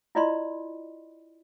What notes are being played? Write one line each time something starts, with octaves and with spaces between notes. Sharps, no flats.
E4 F4 D5 D#5 B5 C6